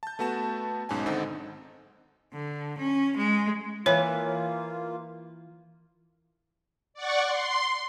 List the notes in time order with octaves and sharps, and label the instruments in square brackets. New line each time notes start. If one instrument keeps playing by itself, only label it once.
[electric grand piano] A5 G6
A3 B3 F#4 A5 E7
B1 G#2 C#4 G#5
G#1 D3 C4 D#4 A4 F#5
[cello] D3
C#4
G#3
[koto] E3 B4 [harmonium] A#3 F4 [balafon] C#5
[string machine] D5 F#5 C#6
C6